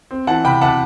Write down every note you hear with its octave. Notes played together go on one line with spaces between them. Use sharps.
C4
E3 F#5 A5
C3 G5 B5
C3 F#5 A5